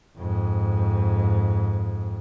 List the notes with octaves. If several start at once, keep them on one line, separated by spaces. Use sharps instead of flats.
F2 G#2